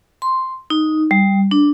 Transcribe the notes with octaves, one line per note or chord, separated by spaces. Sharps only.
C6
D#4
G3
D4